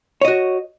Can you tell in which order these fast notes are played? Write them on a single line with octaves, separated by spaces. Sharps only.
C#5 D#5 F#4